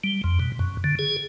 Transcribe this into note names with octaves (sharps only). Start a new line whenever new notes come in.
G3
F2
B2
F#2
D3
G#4